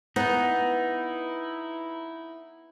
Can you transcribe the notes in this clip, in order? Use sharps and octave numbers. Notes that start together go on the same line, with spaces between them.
B3 D#4 E4